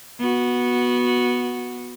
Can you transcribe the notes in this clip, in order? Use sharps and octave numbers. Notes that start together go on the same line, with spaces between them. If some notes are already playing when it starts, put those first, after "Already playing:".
B3 F#4